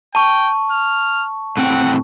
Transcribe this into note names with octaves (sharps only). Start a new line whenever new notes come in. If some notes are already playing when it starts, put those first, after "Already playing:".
G5 A5 C#6
F6
A2 C4 F#5 G5